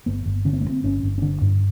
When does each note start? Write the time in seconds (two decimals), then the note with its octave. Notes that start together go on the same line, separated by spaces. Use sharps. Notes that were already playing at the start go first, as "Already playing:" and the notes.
0.06 G1 B3
0.26 G1
0.45 D3 C#4
0.53 C4
0.61 B3
0.65 G2
0.69 C4
0.84 G1 C#4
1.03 G1
1.18 C#4
1.22 D3 D4
1.42 G2